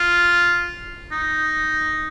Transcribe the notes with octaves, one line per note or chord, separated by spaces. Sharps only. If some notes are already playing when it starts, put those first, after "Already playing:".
Already playing: F4
D#4